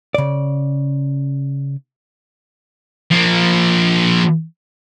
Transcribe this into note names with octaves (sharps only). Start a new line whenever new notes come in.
C#3 D5
F3 A#3